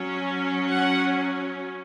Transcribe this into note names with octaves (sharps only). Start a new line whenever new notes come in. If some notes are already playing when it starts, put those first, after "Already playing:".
Already playing: F#3 C#4
F#5